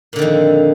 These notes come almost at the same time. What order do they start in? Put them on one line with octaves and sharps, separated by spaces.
A#2 D3 D#3 F2